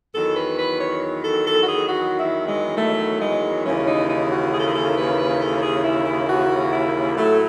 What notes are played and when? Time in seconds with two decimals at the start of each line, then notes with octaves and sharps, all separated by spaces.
0.14 E2 D#3 F#3 A4
0.35 B4
0.58 B4
0.79 C#5
1.23 A4
1.46 A4
1.62 F#4
1.67 G#4
1.89 F#4
2.19 E4
2.47 G#3
2.76 A3
3.21 G#3
3.65 D#2 C#3 E3 C#4
3.87 D#4
4.08 D#4
4.30 F#4
4.53 G#4
4.59 A4
4.67 G#4
4.74 A4
4.96 B4
5.18 B4
5.40 A4
5.61 G#4
5.84 E4
6.05 E4
6.28 F#4
6.72 E4
7.15 A2 F#3 A3